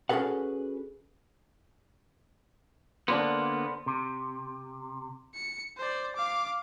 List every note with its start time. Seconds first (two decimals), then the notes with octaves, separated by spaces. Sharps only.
0.09 C#4 F#4 G#4 A4 B4 F#5
3.08 D3 A#3 B3 C5 D5 A5
3.86 C3
5.34 C#7
5.77 C5 D5
6.16 F5 D6